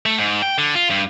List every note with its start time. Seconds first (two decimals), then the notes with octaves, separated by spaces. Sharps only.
0.06 A3
0.18 G#2
0.42 G5
0.58 D3
0.75 F4
0.90 G2